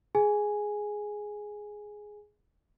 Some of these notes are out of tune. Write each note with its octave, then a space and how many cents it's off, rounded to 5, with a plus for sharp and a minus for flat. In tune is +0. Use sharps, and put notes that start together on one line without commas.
G#4 +5 G#5 +0